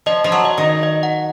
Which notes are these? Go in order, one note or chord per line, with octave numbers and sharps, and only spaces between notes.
F3 D#5
F3 D#5
F#3
D#5
D#3
D#5
D#5
F#5